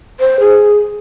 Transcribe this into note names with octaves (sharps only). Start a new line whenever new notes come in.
C5
G#4